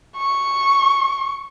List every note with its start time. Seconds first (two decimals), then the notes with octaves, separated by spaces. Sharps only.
0.17 C#6